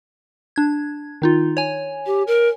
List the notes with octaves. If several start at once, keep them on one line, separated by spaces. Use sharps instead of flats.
D4 G#6
D#3 D#4 F4
C#5 G#5
G4
A#4